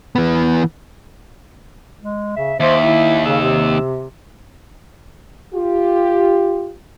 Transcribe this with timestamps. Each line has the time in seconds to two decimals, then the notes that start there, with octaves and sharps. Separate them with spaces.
0.16 E3 B3
2.02 G#3
2.36 C#3 E5
2.60 D#2 C5 E5
2.83 E4
3.25 C#3 E6
3.41 C3
5.54 F4 G4